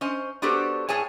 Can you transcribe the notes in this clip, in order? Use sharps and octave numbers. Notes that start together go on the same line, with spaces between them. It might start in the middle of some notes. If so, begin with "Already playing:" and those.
C#4 C5 D#5
B3 D4 F#4 G4 A4 C5
A2 G#4 C#5 G#5 A5